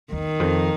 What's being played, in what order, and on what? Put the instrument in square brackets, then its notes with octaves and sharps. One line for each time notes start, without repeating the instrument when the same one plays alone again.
[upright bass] E2 [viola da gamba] D#3
[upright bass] F2